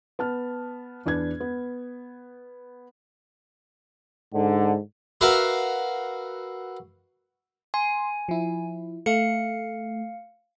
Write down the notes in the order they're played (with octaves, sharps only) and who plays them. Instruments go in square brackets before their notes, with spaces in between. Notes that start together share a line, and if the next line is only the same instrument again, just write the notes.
[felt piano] B3 A5 F6
E2 D4 B4 G#6
B3
[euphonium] G#2 [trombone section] D3
[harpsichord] F#4 A#4 B4 E5 F5
[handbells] G#5 [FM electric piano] C6
[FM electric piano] F3 E4
[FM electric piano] A3 [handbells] F5 C#7